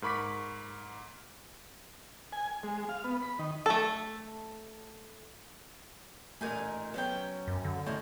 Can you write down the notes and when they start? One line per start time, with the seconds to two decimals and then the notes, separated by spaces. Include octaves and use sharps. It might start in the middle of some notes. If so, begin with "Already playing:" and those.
0.02 G#2 A#4 B5 C#6 D6 B6
2.33 G#5
2.63 G#3
2.89 F5
3.04 B3
3.22 B5
3.39 D#3
3.66 A3 A4
6.41 A1 A#2 A3 D#4 A#4 G#5
6.94 F#3 B3 C#4 G5
7.48 F#2
7.65 D3
7.86 A2 F3 E4 C#5 D#5